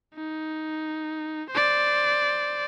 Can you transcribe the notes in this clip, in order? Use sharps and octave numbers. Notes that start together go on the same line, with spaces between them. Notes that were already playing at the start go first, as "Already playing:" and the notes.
D#4
C5 D5